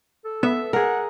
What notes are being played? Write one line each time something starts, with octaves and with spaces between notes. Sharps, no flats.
A4
B3 E5
G#4 A#4 F#5